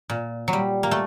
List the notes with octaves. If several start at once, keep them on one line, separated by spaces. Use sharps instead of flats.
A#2
F#3
G3
A#3
A3